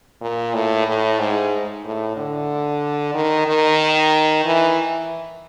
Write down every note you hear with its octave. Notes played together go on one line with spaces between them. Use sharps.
A#2
A2
A2
G#2
A2
D3
D#3
D#3
E3